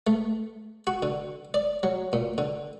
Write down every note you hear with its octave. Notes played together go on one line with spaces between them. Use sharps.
A3
F#4
D3
D5
F#3
A#2
D3